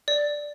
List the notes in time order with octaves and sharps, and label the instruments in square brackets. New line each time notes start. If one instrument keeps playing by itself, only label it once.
[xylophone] D5